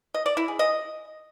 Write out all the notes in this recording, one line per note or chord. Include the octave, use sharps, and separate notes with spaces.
D#5
D5
E4
G#4
D#5